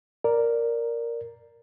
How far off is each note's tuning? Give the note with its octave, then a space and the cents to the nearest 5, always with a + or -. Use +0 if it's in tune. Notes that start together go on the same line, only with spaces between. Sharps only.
A#4 +0 D5 +0